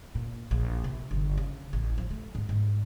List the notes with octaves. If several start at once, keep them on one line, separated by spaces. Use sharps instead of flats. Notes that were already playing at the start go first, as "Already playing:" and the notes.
A#2
A#1
C3
G1
C#3
A1
F3
A3
G#2
G#2